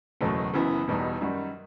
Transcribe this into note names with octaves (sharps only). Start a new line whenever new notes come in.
F#1 E2 B2 F#3 A3
F#1 F#2 E3 B3
E1 E2 B2 G3 D#4
F#2 D#3 G3 D#4 F#4